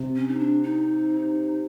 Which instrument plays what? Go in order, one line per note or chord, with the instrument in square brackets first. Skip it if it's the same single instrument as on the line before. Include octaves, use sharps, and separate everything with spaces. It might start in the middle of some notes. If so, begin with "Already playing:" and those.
Already playing: [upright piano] C3
[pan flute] C#4
D#4
D4
D#4